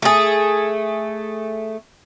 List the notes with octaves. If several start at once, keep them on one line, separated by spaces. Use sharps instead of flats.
A3 G#4